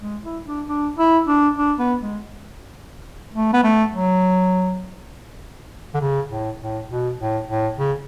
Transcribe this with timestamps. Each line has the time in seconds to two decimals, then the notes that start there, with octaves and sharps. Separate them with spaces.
0.01 G#3
0.24 E4
0.46 D4
0.68 D4
0.98 E4
1.28 D4
1.57 D4
1.79 B3
2.01 G#3
3.34 A3
3.53 B3
3.63 A3
3.93 F#3
5.94 D3
6.00 C#3
6.29 A2
6.60 A2
6.89 B2
7.18 A2
7.47 A2
7.77 C#3